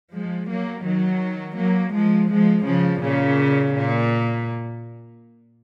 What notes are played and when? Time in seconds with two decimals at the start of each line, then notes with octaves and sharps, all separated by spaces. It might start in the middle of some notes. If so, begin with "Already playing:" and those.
0.13 F3 G#3
0.49 F#3 A#3
0.85 D#3 F#3
1.57 F#3 A#3
1.94 F3 G#3
2.30 F3 G#3
2.66 C#3 F3
3.02 A#2 C#3
3.74 A#2